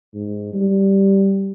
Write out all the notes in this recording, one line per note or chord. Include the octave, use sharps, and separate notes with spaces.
G#2
G3